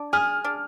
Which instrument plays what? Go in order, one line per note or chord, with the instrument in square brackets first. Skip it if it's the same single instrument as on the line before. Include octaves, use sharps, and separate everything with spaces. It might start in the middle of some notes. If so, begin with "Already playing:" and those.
Already playing: [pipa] D4
[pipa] G#4 [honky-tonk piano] F6
[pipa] D4